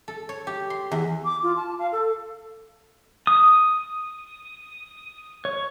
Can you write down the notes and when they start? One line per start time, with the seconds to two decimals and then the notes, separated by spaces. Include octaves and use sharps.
0.08 A4
0.29 C#5
0.47 G4
0.70 C6
0.91 E2
1.25 D6
1.43 F4
1.56 A5
1.79 F5
1.92 A4
3.27 D#6
5.45 C#5